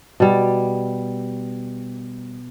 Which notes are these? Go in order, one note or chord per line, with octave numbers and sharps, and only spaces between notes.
B2 G3